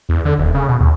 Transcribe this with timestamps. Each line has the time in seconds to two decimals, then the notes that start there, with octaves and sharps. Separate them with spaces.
0.09 E2
0.25 D3
0.38 D#1
0.54 C#3
0.68 B2
0.80 D#2